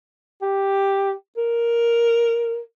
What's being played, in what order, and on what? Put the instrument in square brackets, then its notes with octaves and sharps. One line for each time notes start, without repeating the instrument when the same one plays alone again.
[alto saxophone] G4
A#4